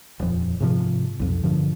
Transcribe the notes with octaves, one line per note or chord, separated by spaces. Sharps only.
D#1 F2
G#2 C3 F3
B1 F2
G2 D3 F3